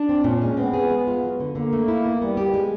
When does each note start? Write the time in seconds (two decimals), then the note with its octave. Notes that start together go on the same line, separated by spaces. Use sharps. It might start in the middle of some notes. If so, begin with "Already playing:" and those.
Already playing: D4
0.09 C4
0.24 A#2 C#4
0.42 G#3
0.57 B3 C4
0.73 G#4
0.90 G#3
1.07 F4
1.24 F#3
1.40 D3
1.55 D3 A#3
1.73 A3
1.88 E4
2.06 B3
2.22 G3 B3
2.37 G4
2.54 G#3